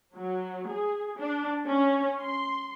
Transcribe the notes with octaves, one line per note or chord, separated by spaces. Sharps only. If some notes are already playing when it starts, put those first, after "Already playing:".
F#3
G#4
D4
C#4
C6